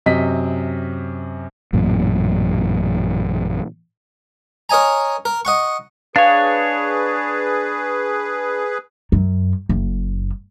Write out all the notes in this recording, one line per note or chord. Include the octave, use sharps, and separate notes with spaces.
F#2 C3 D#5 B6
A1 F#2 A#2
A#4 C#5 D#5 G#5 A#5
A#4
D#5 F#5 C#6
D4 G#4 B4 C#5 F5
F#2
F#1